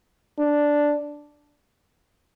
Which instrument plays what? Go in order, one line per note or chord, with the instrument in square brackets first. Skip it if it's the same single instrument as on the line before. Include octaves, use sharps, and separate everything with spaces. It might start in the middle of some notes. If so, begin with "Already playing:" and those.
[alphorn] D4